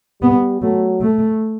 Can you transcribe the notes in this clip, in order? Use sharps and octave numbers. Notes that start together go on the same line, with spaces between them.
G3 B3
F#3 A3
A3